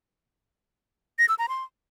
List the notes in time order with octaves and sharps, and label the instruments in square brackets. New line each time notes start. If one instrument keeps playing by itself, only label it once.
[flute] A#6
E6
A#5
C6